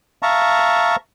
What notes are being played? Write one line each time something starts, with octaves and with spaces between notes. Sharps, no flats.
E5 F5 A5 A#5 C#6